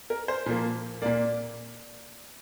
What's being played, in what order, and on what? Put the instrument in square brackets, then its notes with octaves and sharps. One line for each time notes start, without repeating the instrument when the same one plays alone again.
[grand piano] A#4
C5
A#2 F3 A#3
A#2 A#3 D5